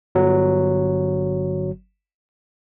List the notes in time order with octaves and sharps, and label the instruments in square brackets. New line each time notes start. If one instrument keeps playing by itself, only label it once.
[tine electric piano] G1 F#3